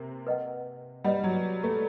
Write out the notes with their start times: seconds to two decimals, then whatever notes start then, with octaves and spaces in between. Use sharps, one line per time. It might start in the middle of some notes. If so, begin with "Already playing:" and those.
Already playing: C3 A#3
0.27 B4 D#5 F#5
1.04 G3 B4 D#5 F#5
1.24 F#3
1.63 A3